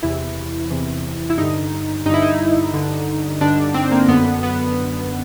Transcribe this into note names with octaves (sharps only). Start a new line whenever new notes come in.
E2 C3 E3 E4
E2 C3 E3
E4
G2 D3 D#4
G2 D3 D#4 E4
D#4
G2 D3
G2 D3 D4
C4
A#3
F#2 D3 B3
B3